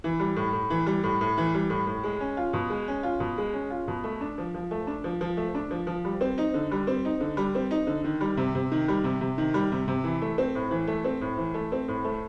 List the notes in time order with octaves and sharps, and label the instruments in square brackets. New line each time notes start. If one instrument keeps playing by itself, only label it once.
[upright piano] E3
G3
A2
A2
E3
G3
A2
A2
E3
G3
A2
A2
G#3
C#4
F4
B2
G#3
C#4
F4
B2
G#3
C#4
F4
B2
A3
D4
F3
F3
A3
D4
F3
F3
A3
D4
F3
F3
G3
C4
D#4
D3
G3
C4
D#4
D3
G3
C4
D#4
D3
D#3
G3
C3
C3
D#3
G3
C3
C3
D#3
G3
C3
C3
E3
A3
C4
A2
E3
A3
C4
A2
E3
A3
C4
A2
A3